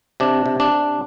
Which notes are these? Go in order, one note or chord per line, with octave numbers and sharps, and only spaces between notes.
C3 D4
C3
D4
C3